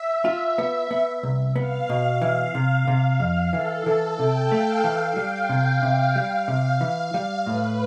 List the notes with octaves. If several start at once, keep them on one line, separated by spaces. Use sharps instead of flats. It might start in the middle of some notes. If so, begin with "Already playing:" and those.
Already playing: E5
F4
B3
B3
C2
B3 F5
B2
E3 F5
C3
C3
F2
E3 A4
E3
C3 G5
A3 F5
E3 F5
G3 G5
C3 F5
C3
G3
C3
E3
G3
A2 B4